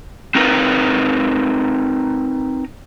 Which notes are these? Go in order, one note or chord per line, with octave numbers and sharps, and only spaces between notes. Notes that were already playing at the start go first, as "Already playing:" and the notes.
C4 D#4 A#4 B4